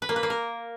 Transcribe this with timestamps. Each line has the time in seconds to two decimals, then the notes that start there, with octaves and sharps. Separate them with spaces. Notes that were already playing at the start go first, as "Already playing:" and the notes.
0.02 B4
0.09 A#3
0.16 B4
0.23 A#3
0.30 A#4